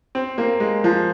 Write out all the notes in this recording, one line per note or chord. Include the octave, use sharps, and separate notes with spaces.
C4
A#3
G#3
F3